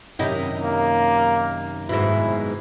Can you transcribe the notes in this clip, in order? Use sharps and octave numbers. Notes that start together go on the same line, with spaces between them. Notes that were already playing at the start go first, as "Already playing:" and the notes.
F#2 C3 D#3 D#4 E4 G4
A#3
G#2 B2 E4